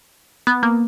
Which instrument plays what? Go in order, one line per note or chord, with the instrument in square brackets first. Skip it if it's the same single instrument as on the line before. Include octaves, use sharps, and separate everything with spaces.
[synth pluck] B3
A#3